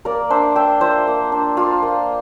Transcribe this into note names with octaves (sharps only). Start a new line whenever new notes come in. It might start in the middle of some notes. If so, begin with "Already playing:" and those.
A#3 A#4 D5
D4 C5 E5
D4 E5 G5
F4 C5 E5
A#3
D4
A#3 F4
A#3